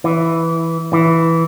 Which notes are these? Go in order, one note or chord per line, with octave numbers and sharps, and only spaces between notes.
E3
E3